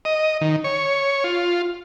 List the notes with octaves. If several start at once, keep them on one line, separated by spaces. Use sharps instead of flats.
D#5
D#3
C#5
F4